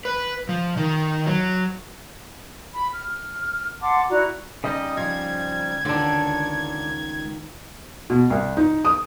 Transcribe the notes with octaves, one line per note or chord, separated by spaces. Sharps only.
B4
F3
D#3
F#3
B5
F6
F#5 A5 C6 D6
E4 F#4 D5 A#5
C#3 G3 D#4 D#5
F3 G#6
C#2 D3 D#3 D4 F4
B2
C2
D#4
D#6